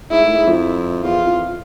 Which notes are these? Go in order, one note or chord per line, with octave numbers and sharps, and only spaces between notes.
G#2 E4
A2
G#2
F2
E2 F4
F2